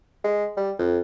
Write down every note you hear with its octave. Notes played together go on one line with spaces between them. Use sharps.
G#3
G3
F2